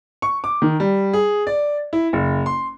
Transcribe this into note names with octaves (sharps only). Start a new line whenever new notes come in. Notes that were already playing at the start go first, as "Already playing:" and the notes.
C#6
D6
D#3
G3
G#4
D5
E4
F#1
C6